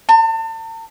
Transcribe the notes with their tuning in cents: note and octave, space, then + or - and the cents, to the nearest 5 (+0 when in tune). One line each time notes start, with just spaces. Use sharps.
A5 +40